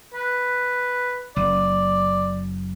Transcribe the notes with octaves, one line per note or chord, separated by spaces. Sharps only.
B4
F#1 D5